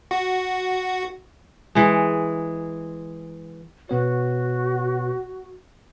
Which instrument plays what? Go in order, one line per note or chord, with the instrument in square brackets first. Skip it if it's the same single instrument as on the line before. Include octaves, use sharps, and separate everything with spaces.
[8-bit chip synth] F#4
[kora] E3 G#3
[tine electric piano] B2 B3 C#5 [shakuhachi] F#4